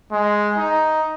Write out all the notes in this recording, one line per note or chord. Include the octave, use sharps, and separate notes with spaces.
G#3
D#4